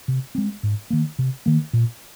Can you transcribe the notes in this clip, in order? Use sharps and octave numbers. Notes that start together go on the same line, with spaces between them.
C3
G#3 C4
G#2
D#3 A#3
C3
D#3 A#3
A#2